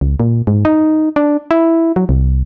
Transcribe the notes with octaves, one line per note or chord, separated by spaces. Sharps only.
C#2
A#2
G#2
D#4
D4
E4
F#3
C2